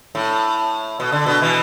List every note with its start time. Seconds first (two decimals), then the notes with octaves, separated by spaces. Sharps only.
0.15 A2
1.00 B2
1.12 D3
1.26 B2
1.42 B2 E3